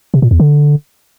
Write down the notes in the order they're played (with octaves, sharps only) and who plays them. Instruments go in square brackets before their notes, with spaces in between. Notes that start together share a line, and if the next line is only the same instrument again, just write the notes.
[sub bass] C3
A#2
E2
D3